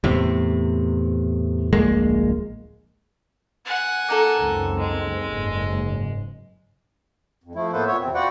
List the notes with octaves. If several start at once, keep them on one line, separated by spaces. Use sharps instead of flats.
E2 A2 C3
D1 A#1 G#3 A#3
F#5 G#5
A#3 D#4 A4
C#2 F#2 C4
G#3
F#1 G#2
F2
F3 A3 E4
A2 A#3 B3 A4 B4 C5
A#2 B3 C#5 E5
E2 C3 C4
F4 F#4 B4 D5 F#5 G5